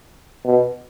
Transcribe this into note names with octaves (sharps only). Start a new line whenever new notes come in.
B2